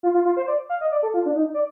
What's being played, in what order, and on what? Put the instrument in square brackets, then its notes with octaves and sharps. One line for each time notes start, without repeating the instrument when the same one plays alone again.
[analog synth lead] F4
F4
F4
C5
D5
F5
D#5
D5
A4
F4
D4
D#4
D5